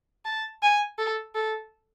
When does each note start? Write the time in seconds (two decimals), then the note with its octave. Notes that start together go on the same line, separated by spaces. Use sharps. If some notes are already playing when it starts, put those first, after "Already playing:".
0.25 A5
0.62 G#5
0.98 A4
1.35 A4